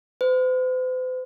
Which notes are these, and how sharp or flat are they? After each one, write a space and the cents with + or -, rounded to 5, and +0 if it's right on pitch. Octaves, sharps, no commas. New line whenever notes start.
C5 -45